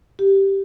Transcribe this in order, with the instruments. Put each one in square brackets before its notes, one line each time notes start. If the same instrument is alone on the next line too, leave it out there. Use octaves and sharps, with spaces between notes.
[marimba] G4